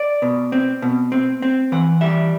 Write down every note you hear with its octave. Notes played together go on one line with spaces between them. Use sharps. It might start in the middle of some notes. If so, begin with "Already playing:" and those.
Already playing: D5
B2
C4
B2
C4
C4
E3 F#5
G3 E5